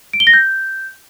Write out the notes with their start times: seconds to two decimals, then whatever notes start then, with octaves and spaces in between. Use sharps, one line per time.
0.13 D7
0.20 G7
0.27 A#6
0.33 G6